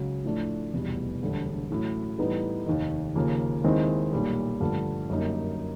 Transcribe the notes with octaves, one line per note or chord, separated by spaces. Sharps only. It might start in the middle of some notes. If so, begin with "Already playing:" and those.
Already playing: C#2 C#3 F#3
A2 F3 A3 D4
F1 E2 B2 G3
E1 D2 D3 G3
A1 A2 F#3
A2 E3 G3 B3 D#4
F1 D#2 D#3
D#2 C#3 F3 A#3
D#2 D#3 G#3 C4 E4
B1 A#2 G3
G2 D3 F3 A3
F#2 D3 G3 A#3 D#4